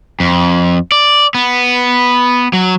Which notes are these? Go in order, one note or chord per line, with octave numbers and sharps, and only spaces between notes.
F2
D5
B3
F#3